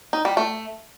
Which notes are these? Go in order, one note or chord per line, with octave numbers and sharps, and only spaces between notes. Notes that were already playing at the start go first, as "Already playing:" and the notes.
D#4
G3
A3